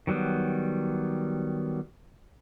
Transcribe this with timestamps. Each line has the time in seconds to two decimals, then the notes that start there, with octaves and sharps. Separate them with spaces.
0.07 D#3 F#3 G3 B3